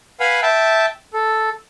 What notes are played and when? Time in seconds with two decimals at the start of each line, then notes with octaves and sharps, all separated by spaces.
0.20 B4 F5 F#5 G#5 B5
0.42 E5 G5 A5
1.14 A4